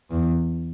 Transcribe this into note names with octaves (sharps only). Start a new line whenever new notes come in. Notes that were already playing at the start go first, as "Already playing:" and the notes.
E2